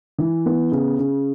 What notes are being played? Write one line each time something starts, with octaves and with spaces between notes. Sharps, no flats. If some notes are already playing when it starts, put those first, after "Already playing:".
E3
B3
C#3
C#3